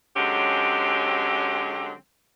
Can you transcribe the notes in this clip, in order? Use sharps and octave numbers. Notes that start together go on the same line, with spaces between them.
D3 F#3 G#3 C4 C#4 G4